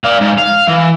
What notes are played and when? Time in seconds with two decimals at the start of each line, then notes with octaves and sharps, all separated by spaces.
0.04 D5 F5
0.20 G#2
0.38 F5
0.68 E3